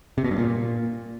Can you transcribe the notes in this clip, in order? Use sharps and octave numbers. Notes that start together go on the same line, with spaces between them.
C3
B2
G2
A#2